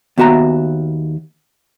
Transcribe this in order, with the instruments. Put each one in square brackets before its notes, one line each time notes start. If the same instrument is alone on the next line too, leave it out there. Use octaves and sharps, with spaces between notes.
[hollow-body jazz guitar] D#2 B3 F#4 E5 A#5